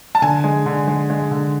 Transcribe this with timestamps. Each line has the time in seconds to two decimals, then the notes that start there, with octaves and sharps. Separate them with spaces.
0.15 A5
0.22 D3 G#5
0.44 G#3
0.66 D3
0.88 G#3
1.10 G#3
1.31 D3